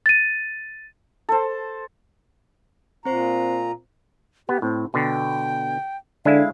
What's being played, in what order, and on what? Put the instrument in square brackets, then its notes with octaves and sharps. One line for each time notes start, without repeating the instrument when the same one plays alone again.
[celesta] A6 D#7
[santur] A4 C5
[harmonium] A#2 A#5 [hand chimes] C4 C5 C7
[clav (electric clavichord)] B3 [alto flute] G4
[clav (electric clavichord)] A2 [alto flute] C4
[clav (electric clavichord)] B2 D3 [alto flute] G5
[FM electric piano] D3 [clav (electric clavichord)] G#3 E4 E5 [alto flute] F5